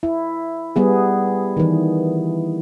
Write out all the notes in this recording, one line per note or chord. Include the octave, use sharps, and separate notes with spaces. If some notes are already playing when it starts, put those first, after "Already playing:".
E4
G3 B3 G#4
D#3 E3